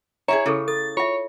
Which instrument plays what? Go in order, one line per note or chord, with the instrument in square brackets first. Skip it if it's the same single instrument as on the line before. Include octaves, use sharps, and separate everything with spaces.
[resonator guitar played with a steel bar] E4 F#4 G#4 [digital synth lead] C#5 [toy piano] A#5
[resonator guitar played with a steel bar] C#3 [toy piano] E4 G#4 A4
[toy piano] A4 [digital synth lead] A6
[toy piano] F4 E5 [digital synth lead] C#5